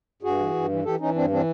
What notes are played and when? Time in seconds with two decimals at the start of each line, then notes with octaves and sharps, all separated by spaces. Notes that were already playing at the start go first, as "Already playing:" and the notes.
0.22 G2 F#4 G#4
0.39 E3
0.54 G2
0.70 E3
0.84 E3 G4 A4
0.99 E3 C#4 D#4
1.15 G2 C4 D4
1.30 E3 C4 D4